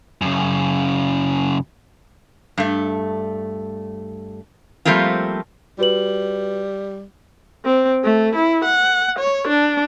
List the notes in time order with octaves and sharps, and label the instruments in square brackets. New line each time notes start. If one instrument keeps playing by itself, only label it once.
[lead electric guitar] F#2 C#3
[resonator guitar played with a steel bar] G2 A3
F3 G3 A3 A#3 C4 F4
[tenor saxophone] G3 [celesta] F#4 B4 F#7
[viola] C4
A3
E4
F#5
C#5
D4